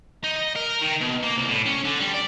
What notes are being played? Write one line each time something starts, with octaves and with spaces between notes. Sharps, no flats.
D#4
D#5
A#4
D#3
B2
A#3
C2
A2
C#4
D3
G3
D5